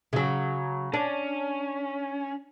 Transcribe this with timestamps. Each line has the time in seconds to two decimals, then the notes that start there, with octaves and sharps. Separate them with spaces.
0.13 C#3 F#3
0.94 C#4 D4